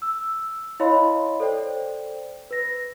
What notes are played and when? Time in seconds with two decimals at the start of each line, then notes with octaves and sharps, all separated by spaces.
0.02 E6
0.80 E4 C#5 D#5 F5 B5 C6
1.40 A4 C5 D5 G5
2.51 B4 A#6